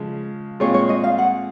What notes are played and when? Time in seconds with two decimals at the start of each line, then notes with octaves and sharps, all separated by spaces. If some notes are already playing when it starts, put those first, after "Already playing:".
Already playing: C#3 F3 G#3
0.60 A#2 G#3 C4 F4 G#4 C#5
0.74 C#5
0.89 D#5
1.04 F5
1.18 F#5